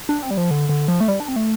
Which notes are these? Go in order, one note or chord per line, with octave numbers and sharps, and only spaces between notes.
D4
C4
G3
F3
D3
D3
F3
A3
G3
D4
C4
A3